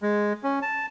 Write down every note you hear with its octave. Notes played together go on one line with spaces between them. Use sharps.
G#3
C#4
A5